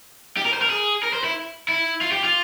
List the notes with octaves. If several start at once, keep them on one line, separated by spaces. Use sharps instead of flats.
G4
A#4
C5
A#4
G#4
A#4
C5
E4
E4
F4
G4
F4